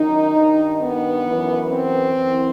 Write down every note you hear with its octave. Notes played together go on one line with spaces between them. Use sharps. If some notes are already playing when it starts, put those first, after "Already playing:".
Already playing: F#2 D#3 D#4
G2 D#3
B3
F#2 E3
C4
F#2 E3